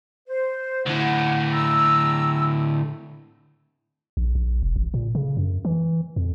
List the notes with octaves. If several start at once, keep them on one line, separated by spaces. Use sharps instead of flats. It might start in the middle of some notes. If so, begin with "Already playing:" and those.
C5
D2 A2 F#5
D5 A#5 E6
A#1
A#1
E1
A1
A#2
C#3
F#2
E3
F2